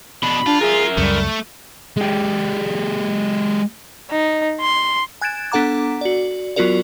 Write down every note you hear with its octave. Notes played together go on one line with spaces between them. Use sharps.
B2 D4 B5
D4 F4
G#4 A#4 E5
C#2 F#2 G3 A3
G#3 G4
D#4
C6
G#5 F#6 G#6 A6 D7 E7
B3 D4 A4 F#5 A#5 D6
F#4 D5
F#3 B3 F4 F#4 A#4 D5